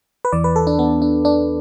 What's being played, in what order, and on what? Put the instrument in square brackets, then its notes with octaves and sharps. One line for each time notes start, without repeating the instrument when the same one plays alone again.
[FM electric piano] B4
E2 E3 D5
B4
A4
D4
B3
D4
D4